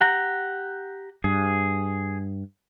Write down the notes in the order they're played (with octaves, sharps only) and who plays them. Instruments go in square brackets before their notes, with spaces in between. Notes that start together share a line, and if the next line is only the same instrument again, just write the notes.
[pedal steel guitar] G4 F#5 A#5
[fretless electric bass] G2 [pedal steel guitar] G#4